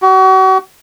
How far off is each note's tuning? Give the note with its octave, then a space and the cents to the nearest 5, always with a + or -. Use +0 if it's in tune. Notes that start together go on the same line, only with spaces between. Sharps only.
F#4 +35